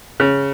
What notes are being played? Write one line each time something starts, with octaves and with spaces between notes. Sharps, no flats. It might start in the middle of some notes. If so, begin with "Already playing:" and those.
C#3